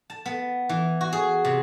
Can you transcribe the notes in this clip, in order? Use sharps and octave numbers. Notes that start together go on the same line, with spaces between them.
A5
B3
E3
F#4
G#4
C3